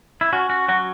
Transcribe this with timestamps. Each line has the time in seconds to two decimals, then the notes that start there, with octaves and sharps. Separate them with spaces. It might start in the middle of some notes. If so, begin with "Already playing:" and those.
0.21 E4
0.33 C#4 F#4
0.50 F#4
0.68 F#3 F#4